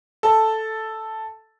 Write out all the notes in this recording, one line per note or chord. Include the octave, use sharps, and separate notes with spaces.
A4 A5